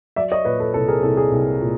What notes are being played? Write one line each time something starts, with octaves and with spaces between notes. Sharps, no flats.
F#3 D5 E5
C#5 D#5
A#2 B4 C#5
A4 B4
C2 A4
G#4 A#4
C2 A4
G#4
C2
A#2